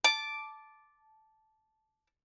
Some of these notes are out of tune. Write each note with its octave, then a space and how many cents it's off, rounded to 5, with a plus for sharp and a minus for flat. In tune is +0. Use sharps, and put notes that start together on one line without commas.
A5 -10 D6 +0